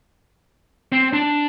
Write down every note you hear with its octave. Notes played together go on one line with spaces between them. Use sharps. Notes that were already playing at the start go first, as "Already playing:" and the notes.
C4
D4